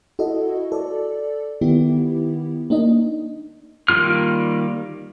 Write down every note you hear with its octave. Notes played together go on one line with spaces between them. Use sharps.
E4 F#4 A4 D#5
A4 D5
D#3 B3 E4 G4
A#3 D4 D#4 D#5
D#3 G3 A#3 F4 F6